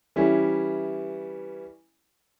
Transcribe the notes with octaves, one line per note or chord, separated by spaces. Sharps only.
E3 G3 C#4 E4